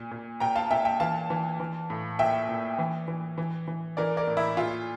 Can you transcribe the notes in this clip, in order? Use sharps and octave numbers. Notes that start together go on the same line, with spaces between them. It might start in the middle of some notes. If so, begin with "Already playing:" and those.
Already playing: A#2
A#2
A#2 G5 A#5
F5 A5
A#2 E5 G5
E5 G5
E3 F5 A5
E3
E3
A2
A#2 E5 G5
A#2
E3
E3
E3
E3
E3 A#4 D5
A#4 D5
A2
E4
A#2 F4